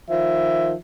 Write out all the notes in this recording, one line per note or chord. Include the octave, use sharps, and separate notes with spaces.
D#3 F3 E5